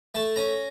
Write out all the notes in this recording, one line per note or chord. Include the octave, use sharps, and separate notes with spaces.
A3 A5
C#4 A#5